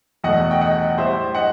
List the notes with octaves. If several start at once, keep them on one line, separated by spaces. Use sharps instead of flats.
E2 B2 A3 D#5 F#5
G5
D#5 F#5
A2 G3 C5 E5
D#5 F#5